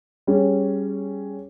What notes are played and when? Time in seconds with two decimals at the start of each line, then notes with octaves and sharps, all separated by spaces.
0.27 G3 C#4 G#4